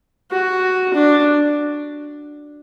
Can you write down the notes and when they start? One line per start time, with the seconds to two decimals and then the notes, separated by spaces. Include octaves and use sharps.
0.31 F#4
0.94 D4